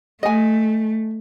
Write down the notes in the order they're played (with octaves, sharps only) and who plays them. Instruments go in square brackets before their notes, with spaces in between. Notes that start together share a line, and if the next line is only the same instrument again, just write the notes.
[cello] A3 [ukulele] D#5 G#5